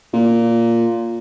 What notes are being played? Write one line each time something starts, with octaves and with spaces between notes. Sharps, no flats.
A#2